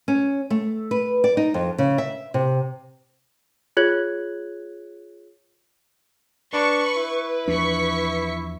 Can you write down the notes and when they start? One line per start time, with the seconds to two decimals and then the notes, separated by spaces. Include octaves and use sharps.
0.08 C#4
0.50 A3
0.91 B4
1.24 D5
1.37 D#4
1.54 F2
1.78 C#3
1.98 E5
2.34 C3
3.77 F4 G#4 C#5 F#6 G#6 F#7
6.53 D4 B4 C#6
6.97 E4
7.48 E2 F3 D4 C#6 B6